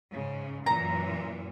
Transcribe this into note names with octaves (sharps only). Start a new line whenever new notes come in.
G#2 C#3
F#2 A#2 E3 A#5